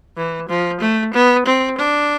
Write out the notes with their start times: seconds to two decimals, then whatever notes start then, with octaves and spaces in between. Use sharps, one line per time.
0.17 E3
0.49 F3
0.81 A3
1.14 B3
1.46 C4
1.78 D4